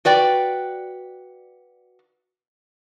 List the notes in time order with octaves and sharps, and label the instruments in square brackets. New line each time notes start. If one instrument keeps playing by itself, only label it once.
[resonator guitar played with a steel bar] F#4 B4 D5 G5